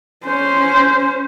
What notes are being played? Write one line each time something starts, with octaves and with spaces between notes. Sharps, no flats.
C#4 C5